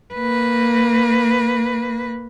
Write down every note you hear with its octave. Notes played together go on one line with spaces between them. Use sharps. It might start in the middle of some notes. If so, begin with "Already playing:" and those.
A#3 B4